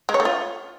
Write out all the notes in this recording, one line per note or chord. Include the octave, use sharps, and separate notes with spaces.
G#3
C#5
A3
F4